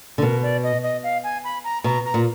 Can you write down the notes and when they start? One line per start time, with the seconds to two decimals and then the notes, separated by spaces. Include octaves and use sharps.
0.18 D3
0.22 B2 A#4
0.43 D5
0.63 D#5
0.83 D#5
1.03 F5
1.24 G#5
1.44 B5
1.64 A#5
1.84 B2 A#5
2.05 A#5
2.14 A#2